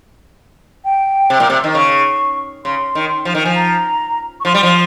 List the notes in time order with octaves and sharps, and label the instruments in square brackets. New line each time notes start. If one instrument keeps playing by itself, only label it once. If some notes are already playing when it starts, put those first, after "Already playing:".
[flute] G5
[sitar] C3
A#2
C3
D#3
[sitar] C#3 [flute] C#6
[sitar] C#3 [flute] C6
[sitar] D#3
F3
D#3
[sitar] F3 [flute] G#5
[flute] A#5
C#6
[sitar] F3 [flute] C6
[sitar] G3
F3